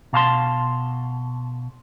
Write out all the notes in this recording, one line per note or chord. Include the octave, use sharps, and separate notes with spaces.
B2 F5 A5 C6